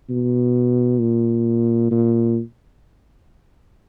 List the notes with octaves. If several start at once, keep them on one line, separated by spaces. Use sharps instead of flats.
B2
A#2
A#2